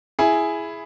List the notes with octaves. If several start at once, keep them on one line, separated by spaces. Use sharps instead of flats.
E4 G#4